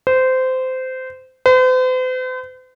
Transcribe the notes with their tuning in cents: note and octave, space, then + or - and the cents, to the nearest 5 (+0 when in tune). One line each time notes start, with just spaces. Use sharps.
C5 -20
C5 -45